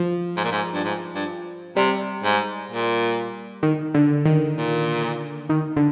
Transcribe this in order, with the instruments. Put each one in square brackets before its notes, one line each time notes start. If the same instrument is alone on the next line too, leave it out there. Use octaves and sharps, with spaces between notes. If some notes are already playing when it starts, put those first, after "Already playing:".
Already playing: [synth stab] F3
[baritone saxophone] G#2
A#2
G#2
G2
G#2
G2
[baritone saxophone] C3 [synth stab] G3
[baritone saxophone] G#2
A#2
[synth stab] D#3
D3
D#3
[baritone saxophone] A#2
[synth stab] D#3
D3